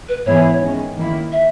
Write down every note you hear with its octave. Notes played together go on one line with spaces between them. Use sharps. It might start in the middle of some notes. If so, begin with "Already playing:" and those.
B4
G#2 E3 B3 E4 G#4 C#5
D#3 G#3 C#4
D#3 A#3 E4
E5